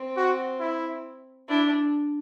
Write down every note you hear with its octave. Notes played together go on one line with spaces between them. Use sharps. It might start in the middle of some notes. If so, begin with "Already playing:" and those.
Already playing: C4
F#4
E4
D4 E4